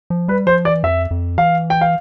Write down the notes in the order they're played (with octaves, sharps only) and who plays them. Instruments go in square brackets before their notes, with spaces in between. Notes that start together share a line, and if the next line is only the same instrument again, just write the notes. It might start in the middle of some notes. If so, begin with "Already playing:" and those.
[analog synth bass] F3
[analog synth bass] G3 [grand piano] B4
[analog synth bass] F3 [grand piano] C5
[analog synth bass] E3 [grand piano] D5
[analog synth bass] F2 [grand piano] E5
[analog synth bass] F2
[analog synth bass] E3 [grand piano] F5
[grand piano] G5
F5